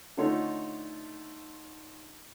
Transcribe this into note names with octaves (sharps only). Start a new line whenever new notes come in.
D3 A3 D#4 F4 C#5